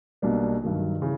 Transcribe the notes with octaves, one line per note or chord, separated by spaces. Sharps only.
B1 B2 G3 A#3 D4
G2 D#3 F#3
C#3 E3